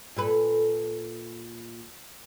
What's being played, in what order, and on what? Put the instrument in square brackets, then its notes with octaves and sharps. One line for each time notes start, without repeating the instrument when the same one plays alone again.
[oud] A#2 A4 B4